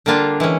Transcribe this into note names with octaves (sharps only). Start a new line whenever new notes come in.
D3 G3 A#3 D4 F4
E3 G#3 C#4